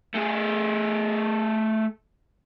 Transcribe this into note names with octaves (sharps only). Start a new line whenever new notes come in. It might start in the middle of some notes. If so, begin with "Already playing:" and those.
A3 G#4